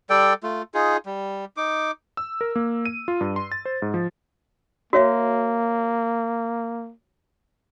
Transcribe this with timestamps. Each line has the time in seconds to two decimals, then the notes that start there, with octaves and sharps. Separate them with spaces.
0.10 G3 A4 D5 G5
0.43 A3 F4
0.74 D#4 F4 G#4
1.06 G3
1.57 D#4 D6
2.17 E6
2.41 A#4
2.55 A#3
2.85 D#7
3.08 F4
3.21 G2
3.36 C6
3.52 A6
3.65 C5
3.82 G#2
3.94 F3
4.93 A#3 F#4 C#5 E5